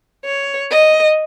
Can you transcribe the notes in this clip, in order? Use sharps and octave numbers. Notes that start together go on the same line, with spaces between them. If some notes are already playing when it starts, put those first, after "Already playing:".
C#5
D#5